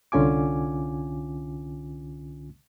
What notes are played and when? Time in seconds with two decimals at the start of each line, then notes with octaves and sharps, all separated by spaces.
0.12 C2 D3 C#4 F4 G#5 D6